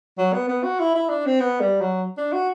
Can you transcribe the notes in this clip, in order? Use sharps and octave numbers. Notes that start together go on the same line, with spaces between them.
F#3
B3
B3
F#4
E4
E4
D4
C4
B3
G3
F#3
D4
F#4